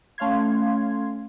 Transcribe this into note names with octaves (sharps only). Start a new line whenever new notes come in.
A3 C#4 F5 C6 G#6